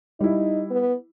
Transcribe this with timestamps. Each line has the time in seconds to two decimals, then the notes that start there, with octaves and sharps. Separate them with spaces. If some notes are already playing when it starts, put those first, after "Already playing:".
0.20 G3 D#4 E4
0.71 B3